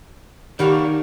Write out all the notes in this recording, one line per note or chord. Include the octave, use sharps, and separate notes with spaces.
D#3 G3 A#3 D4 F#4